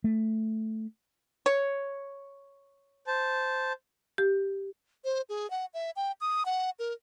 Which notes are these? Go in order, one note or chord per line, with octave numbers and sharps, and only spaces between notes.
A3
C#5
C5 A5
G4
C5
G#4
F#5
E5
G5
D#6
F#5
A#4